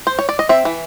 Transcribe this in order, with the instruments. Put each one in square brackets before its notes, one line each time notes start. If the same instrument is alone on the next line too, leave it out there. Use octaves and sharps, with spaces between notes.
[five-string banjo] C5
C#5
D5
D#5
C4 E5
E3